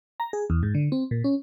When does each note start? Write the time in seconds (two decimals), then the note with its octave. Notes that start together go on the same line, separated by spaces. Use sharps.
0.20 A#5
0.33 G#4
0.50 E2
0.63 G#2
0.75 D3
0.92 C4
1.11 A#2
1.24 C#4